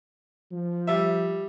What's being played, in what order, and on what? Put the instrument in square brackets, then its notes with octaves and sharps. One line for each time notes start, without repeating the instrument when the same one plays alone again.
[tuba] F3
[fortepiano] G3 E5